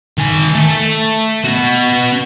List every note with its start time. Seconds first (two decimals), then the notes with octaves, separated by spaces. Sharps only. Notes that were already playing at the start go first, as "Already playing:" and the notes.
0.18 D#3 G#5
0.55 A3 A4
1.45 B3 F#4